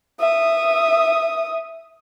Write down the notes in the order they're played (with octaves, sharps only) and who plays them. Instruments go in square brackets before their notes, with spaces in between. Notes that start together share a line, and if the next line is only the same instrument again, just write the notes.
[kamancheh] E5 D#6